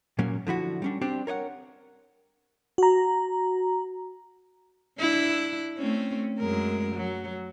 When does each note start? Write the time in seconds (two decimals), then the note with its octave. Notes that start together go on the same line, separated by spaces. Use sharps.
0.19 A#2 F#3 A#3 C#4
0.47 D3 F3 E4 F#4
0.82 G3 C#4 D4
1.01 C4 D4 G4 C5
1.27 A#4 C#5 D#5 F#5
2.78 F#4 A#5
4.99 D4 E4
5.78 A3 C4 C#4
6.39 F#2 G#3 A#4
6.95 F#3